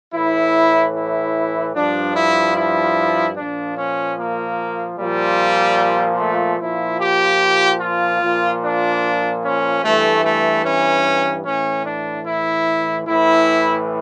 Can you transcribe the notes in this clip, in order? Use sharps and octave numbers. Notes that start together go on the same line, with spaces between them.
A2 E3 E4
E4
G2 F3 D4
E4
E4
A#2 F3 D4
C#4
A#3
A#2 F3 G3
A3
A#2 F3 E4
G4
F4
A#2 F3
D4
C#4
G2 E3 A3
A3
C#4
A2 E3 C#4
D4
E4
A2 E3 E4